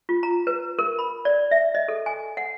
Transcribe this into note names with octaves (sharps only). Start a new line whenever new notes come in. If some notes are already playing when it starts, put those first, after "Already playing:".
F4
A#5
B4
A#4
B5
D5
E5
D#5
A4
G#5
F#5